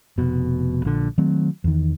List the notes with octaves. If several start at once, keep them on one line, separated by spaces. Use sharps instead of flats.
F1 B2
A#1 D3
D#3 F#3 A3 C4
E2 D#3